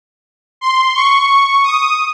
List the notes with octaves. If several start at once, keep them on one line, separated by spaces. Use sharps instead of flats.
C6
C#6
D#6